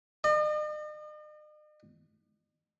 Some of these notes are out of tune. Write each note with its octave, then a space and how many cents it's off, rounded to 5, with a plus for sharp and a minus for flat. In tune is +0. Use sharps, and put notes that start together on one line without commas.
D#5 -45